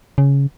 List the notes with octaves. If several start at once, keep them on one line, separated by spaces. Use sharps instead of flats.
C#3